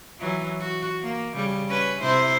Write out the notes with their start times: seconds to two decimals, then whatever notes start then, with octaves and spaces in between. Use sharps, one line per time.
0.20 E3 F#3
0.61 F#4
1.02 A#3
1.34 C#3 G3
1.69 C#4 B4
2.01 C3 E4 C5